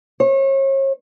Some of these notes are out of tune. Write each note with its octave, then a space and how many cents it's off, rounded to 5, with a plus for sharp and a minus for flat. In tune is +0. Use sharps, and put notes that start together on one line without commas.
C#5 -40